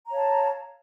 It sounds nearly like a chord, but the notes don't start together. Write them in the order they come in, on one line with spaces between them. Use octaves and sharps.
A#5 C#5 F5 A5